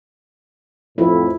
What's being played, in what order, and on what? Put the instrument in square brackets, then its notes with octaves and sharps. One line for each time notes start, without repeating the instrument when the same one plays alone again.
[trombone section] F2 A2 [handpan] E4 [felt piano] F4 B4